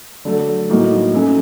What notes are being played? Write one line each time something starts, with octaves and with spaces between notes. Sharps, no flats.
D3 F#3 A3
A2 F#3 A#3 D#4 F#4
F#3 A3 C#4